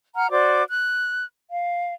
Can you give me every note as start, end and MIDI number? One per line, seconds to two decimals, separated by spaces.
0.16 0.30 78
0.16 0.30 82
0.16 0.30 89
0.31 0.63 66
0.31 0.63 72
0.31 0.63 74
0.31 0.63 86
0.69 1.24 90
1.51 1.94 77